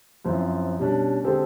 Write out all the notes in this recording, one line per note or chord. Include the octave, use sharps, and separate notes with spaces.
F#2 F3 C4 E4
B2 G3 C#4 D4
D3 G#3 C4 G4 A4 C5